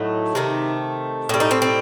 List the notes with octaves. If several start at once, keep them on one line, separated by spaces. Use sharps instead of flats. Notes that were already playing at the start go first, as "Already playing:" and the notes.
Already playing: A2 F#3 A3 D#4
C3 D#3 A3
A2 G3 C4
D#4
C4
C4